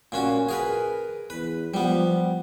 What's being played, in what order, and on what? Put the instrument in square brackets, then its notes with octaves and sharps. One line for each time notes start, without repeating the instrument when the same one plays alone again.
[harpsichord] A#2 C#4 F#4
G#4 A#4 B4
[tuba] E2 [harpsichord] B4
[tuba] F3 [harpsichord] G3 B3